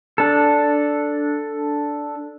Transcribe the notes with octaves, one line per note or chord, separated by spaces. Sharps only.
D4 A4